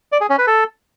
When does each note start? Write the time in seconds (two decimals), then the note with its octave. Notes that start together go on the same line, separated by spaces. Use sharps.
0.12 D5
0.21 G#4
0.30 C#4
0.38 B4
0.47 A4